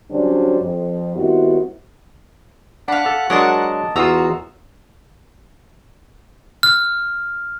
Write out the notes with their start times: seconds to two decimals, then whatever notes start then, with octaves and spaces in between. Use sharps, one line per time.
0.11 D3 F#3 G3 C#4 D4 C5
0.60 F2
1.14 D#3 G3 B3 C4 E4 F#4
2.88 D4 F5 F#5 B5
3.06 A4
3.30 F#3 G#3 D4 A#4 D#5 A5
3.96 E2 F4 F#4 A#5 D#6 E6
6.63 F6